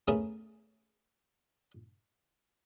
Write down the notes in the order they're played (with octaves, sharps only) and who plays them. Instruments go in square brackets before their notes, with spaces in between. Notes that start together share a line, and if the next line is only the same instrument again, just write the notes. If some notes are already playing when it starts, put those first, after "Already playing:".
[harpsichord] A3 B3 C#4 G#4 A#4 A5